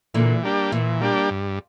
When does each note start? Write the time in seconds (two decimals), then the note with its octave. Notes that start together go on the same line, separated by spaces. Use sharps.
0.14 A#2 D3 E3
0.43 G3 A#3 D4 G4
0.72 A#2 E3
1.01 G3 A#3 D4 G4
1.30 G2